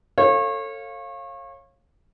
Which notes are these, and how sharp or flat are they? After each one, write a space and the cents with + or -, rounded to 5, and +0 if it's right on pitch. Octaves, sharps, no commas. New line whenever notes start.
A4 +25 C#5 -30 F5 +0